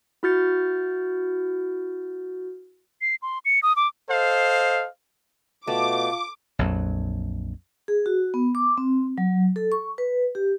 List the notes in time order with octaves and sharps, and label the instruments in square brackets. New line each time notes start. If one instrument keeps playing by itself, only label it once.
[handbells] E4 F#4 F6 G6 A6 C#7
[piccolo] C7
C6
C#7
D#6
D6
[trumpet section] A4 C5 D#5 F5
[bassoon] B2 [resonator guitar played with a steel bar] A3 [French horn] F4 [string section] D6
[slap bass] A#1 F2 F#3
[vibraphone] G#4
F#4
B3
D6
C4
F#3
A4
C#6
B4
G4